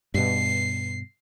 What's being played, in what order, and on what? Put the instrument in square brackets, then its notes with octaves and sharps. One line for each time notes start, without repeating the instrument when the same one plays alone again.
[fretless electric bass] G2 B2 [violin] C7